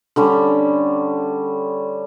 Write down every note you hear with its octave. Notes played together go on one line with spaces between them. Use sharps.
D3 G3 C#4